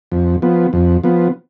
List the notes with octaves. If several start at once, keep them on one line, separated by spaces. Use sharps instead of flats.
F2
F3 B3
F2
F3 B3